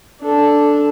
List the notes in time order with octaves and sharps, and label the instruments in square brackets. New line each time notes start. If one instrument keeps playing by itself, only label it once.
[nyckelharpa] D4 A4